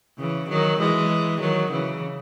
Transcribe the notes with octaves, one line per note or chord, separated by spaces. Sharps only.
C#3 E3
D#3 F#3
E3 G#3
D#3 F#3
C#3 E3